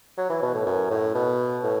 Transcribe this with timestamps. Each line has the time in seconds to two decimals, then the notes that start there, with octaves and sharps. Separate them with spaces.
0.18 F#3
0.30 E3
0.42 B2
0.54 A2
0.66 F#2
0.90 A2
1.15 B2
1.63 A2